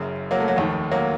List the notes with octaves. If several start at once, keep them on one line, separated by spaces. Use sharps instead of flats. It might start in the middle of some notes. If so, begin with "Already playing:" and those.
Already playing: F#1 F#2 C#3
F#3 A#3
A3
F#3
F1 D#2 D#3 A3
F#3 A#3